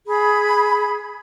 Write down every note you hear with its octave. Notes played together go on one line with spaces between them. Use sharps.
G#4 B5